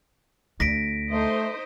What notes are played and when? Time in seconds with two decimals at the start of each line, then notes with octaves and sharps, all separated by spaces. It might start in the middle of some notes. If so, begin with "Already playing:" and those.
0.60 D2 A#6 B6 D7
1.11 A3 D#4 C5 D#5